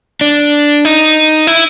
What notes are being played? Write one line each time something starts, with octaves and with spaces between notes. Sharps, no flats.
D4
D#4
E4